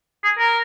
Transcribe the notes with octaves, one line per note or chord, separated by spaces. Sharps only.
G#4
A#4